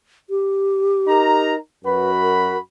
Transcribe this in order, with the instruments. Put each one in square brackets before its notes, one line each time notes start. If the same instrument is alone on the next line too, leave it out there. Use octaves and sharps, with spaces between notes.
[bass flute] G4
[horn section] D#4 A#4 A#5
[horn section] F#2 F#4 B5 [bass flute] B4
[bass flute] A#4